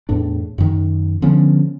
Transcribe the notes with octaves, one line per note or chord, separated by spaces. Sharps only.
E2 A2 D4
F#2 D#3
D3 F3 B3 C#4